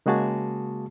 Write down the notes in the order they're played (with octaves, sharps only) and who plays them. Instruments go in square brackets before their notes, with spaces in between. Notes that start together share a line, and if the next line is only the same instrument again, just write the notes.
[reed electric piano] C#3 G#3 A#3 F#4 G#4 A5